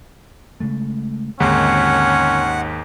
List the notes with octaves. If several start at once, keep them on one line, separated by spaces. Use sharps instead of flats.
C#3 G#3 A3
D#2 G#2 D3 C4 C#4 F#5